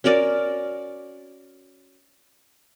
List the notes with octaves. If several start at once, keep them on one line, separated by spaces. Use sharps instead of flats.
C#4 F#4 A#4 D5